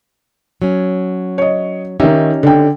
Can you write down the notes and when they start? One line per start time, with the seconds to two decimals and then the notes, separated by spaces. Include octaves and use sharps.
0.62 F#3 C#4
1.38 C#5 D#5
2.00 D#3 C#4 D#4 G4 E5
2.43 D3 G5